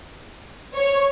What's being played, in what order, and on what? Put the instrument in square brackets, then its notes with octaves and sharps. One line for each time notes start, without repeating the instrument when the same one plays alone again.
[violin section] C#5